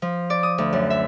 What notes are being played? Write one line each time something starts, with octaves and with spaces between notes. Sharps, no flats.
F3
D5
D#6
D2
F#2
E5